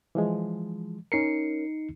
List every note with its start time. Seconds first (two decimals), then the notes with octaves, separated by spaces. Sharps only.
0.15 E3 F3 G#3
1.12 C#4 D#4 A#4 C7 C#7